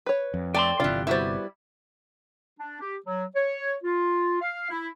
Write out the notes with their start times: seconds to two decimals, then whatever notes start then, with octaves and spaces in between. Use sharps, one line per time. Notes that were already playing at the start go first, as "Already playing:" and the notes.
0.06 B4 C#5
0.34 F2
0.54 A3 D5 G5 A5 C6
0.80 G1 C3 E3 D4 F4 F5
1.07 G3 B3 E4 F#4 C5
2.59 D4
2.81 G4
3.06 F#3
3.36 C#5
3.83 F4
4.41 F5
4.70 E4